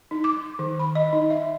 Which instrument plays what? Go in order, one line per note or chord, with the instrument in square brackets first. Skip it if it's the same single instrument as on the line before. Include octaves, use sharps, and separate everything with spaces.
[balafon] D#4
D6
D#3
B5
D#5
D#4
E5